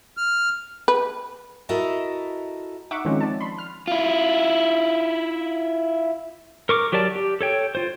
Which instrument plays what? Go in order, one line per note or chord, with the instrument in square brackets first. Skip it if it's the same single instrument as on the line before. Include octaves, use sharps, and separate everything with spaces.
[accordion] F6
[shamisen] B4
[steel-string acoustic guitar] E4 F#4 A4 A#4 D#5 E5
[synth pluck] D#4 E5 F#5 C#6 D6
D#3 F3 G#3 C4 C#4 D#4
D5 A5
B5 C6
F6
[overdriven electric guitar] E4 F4
[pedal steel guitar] A#4 C#6 D6
F#3 G4 A#4 D5 A5
G4
A4 C#5 G5
F4 C5